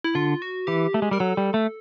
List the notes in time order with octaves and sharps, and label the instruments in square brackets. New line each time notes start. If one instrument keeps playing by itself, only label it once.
[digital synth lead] E4
[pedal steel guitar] D3 [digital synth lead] F4
[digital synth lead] F#4
[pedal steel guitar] E3 [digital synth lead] G4
[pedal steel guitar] A3
G#3
[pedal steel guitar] G3 [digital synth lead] A#4
[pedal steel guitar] F#3 [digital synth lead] A4
[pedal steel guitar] G3
A3